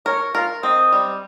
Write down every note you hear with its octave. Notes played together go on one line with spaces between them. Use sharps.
A#4 C#5
F4 A#4
C4 D#5
G3